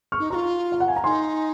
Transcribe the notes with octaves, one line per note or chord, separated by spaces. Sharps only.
C#6 F6
D#4
F4 F#4 A#5 C#6
F5
F#5
G#5
A#5
D#4 G#5 C6